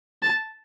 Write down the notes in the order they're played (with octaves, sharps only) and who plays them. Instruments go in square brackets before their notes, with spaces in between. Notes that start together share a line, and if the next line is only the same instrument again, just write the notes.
[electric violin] A5